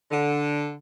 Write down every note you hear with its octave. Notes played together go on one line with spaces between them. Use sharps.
D3